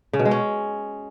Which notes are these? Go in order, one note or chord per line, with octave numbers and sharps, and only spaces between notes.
C#3
B2
G#3
C#4